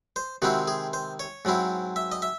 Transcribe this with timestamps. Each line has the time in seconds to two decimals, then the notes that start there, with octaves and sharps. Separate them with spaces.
0.16 C5
0.42 C3 D#3 G#3 C4 E4 F#4
0.68 G#4
0.93 C5
1.20 C#5
1.45 G#2 F#3 C4 E4
1.96 E5
2.12 D#5
2.22 E5